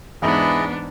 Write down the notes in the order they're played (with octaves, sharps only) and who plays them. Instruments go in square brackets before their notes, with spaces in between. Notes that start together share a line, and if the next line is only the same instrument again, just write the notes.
[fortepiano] E2 G#2 [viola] B3 D4 [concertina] E4 G#4 D#5